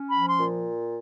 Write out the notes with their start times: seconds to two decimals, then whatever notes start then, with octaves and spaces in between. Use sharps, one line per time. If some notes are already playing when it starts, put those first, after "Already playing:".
Already playing: C#4
0.10 F3 B5
0.29 C6
0.38 A#2